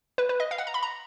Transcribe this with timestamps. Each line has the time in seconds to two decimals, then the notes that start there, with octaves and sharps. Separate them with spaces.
0.18 B4
0.29 B4
0.40 D#5
0.51 F5
0.58 F#5
0.67 A#5
0.74 B5
0.83 A#5